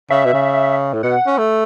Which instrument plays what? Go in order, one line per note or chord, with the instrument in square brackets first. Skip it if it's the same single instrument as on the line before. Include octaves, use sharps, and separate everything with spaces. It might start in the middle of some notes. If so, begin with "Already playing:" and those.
[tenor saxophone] C#3 [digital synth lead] E5
[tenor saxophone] B2
C#3
A2
[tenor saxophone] B2 [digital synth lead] F#5
[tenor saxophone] C#4
A3